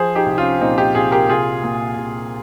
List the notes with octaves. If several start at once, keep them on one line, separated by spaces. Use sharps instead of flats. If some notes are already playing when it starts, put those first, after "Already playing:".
Already playing: F3 G#4 C5
D#4 G4
C2
C#4 F4
A#2 C4 D#4
D#4 G4
C2 F4 G#4
G4 A#4
C2 F4 G#4
A#2
C2